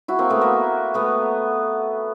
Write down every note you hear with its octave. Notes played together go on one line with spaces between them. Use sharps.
E4 F#4
A#3 C4
A3 B3
A#3
A3 B3